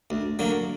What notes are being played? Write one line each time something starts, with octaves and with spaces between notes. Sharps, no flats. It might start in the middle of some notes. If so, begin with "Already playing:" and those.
D2
D3 F#3 A#3